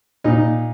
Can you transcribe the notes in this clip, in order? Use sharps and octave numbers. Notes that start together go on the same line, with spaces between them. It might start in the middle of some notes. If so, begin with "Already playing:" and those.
A#2 D#4